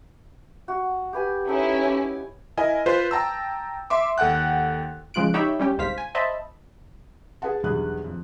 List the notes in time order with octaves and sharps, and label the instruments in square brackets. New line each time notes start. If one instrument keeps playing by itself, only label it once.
[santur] F#4
G4 B4 G#5
[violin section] C#4 E4 [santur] D#4 A4
[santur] G#5 D6
[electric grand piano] E4 A#4 D#5 G#5
F4 B4 C5
G5 A5 A#5 E6
E5 C6 D6
D#2 A4 F#5 G5 F#6
[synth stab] C#3 F3 G#3 F4 F#6 D7
D#4 G4 C#5 E5 G5 B5
G3 C#4 G4
G1 C2 G#2 C5 F5 B6
G#5
C5 D#5 E5 A5 B5
[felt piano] G#4 B4 F#5 A5
B1 E2 D3 G3 G#4 F#6
F2